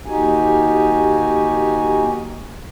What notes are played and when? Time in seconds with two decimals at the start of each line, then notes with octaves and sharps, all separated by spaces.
0.06 D#2 D#4 F#4 G4 G#5